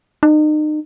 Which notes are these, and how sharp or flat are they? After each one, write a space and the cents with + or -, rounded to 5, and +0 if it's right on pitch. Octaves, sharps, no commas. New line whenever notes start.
D#4 -35